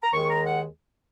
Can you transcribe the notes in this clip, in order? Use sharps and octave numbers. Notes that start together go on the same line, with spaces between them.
A#5
D#2 D#3 G#3 C#6
A#5
F#5